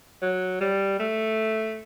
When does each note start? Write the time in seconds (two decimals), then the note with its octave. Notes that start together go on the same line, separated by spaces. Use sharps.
0.22 F#3
0.60 G3
0.99 A3